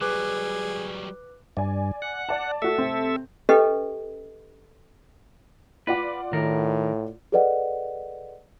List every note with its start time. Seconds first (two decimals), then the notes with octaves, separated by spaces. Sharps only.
0.01 F#3 G3 G#4 B4 D6 F#6
1.57 G2 D5 G#5
2.02 F#5
2.29 D5 A5
2.62 A3 F#4 A4 E5
2.78 C3 A3 C4
3.49 C#4 G4 A4 B4 D#5
5.87 F4 B4 D5 F#5
6.33 A2 D#3 A#4
7.32 G#4 A4 B4 D5 D#5 F#5